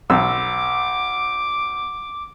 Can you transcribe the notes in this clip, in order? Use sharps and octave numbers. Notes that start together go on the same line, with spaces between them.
B1 D6 E6